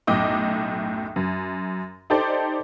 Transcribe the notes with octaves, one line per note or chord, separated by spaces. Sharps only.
B1 F#2 A2 D#5 D6
F#2
D#4 G4 A4 C5 D5